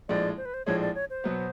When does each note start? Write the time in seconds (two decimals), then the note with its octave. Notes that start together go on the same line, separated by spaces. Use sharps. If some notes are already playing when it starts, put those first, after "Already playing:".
0.09 A#1 A2 F3 G#3 D5
0.37 C5
0.45 B4
0.54 C5
0.66 A#1 A2 F3 G#3 C#5
0.81 D5
0.95 C#5
1.10 C5
1.24 B2 F#3 B3